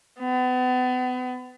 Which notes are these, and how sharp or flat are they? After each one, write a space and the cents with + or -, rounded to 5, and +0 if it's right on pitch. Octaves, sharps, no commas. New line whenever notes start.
B3 +35